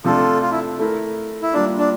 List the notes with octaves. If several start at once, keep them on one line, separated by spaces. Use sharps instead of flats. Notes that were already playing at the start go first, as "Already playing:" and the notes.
C3 F3 A3 D4 F4 A4
F4
E4
A3 E4 A#4
E4
G3 A#3 D4 F4
D4